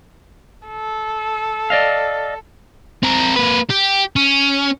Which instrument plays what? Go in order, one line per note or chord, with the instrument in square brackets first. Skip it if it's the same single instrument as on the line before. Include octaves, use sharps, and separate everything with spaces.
[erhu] A4
[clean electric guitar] D5 D#5 F5
[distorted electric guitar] C4 A#4
A#3 B4
G4
C#4